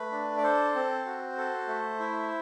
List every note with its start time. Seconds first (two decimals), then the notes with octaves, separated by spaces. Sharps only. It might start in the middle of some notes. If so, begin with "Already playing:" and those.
Already playing: A3 B4
0.12 D4
0.37 D5
0.43 A4 C5
0.75 C4
1.05 F#4
1.38 A4
1.68 A3
1.99 E4